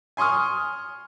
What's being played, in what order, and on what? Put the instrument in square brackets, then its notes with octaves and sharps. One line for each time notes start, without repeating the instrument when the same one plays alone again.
[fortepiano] G#5 C6 C#6 D#6 F6